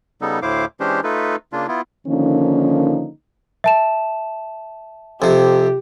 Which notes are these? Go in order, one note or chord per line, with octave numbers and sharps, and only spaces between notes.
C#3 G3 B3 D#4 A4
D2 A2 E4 C5 F5 D6
E3 G#3 C#4 D4 G4 C5
A3 D#4 F4 A4 B4
C#3 A#3 D4 F4
B3 E4 F4
D3 D#3 F3 A#3 C#4 D#4
E5 A5 E7
F2 C3 G4